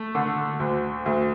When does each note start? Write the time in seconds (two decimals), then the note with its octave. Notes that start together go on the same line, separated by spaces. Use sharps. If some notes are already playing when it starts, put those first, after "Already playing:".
Already playing: A3
0.15 D3
0.60 D2
1.06 D2